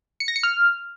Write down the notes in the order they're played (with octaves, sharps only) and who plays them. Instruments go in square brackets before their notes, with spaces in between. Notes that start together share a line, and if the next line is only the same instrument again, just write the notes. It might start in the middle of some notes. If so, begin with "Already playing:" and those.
[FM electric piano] C#7
A#6
C#7
F6